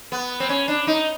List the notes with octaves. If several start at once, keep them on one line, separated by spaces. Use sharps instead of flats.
B3
C4
C#4
D4
D#4